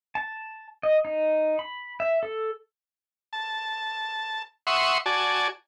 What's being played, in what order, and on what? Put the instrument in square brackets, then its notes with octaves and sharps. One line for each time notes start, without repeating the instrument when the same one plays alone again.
[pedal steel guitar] A5
D#5
D#4
B5
E5
A4
[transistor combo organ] A5
E5 F#5 C6 C#6 D#6
F#4 D5 G#5 A5